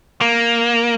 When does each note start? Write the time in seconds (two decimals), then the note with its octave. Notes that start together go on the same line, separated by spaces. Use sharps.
0.21 A#3